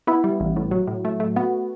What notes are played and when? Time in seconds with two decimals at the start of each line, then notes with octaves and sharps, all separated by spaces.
0.07 B3 E4
0.24 G3
0.40 A1
0.56 A2
0.71 F#3
0.87 A2
1.05 A3
1.20 A3
1.36 B3 F#4